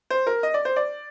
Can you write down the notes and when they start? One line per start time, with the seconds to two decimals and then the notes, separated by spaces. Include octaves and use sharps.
0.10 C5
0.27 A#4
0.43 D#5
0.54 D5
0.65 C5
0.76 D5